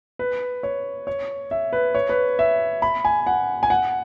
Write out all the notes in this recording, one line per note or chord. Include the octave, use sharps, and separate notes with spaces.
B4
C#5
C#5
E5
B4
C#5
B4
E5
B5
G#5
F#5
G#5
F#5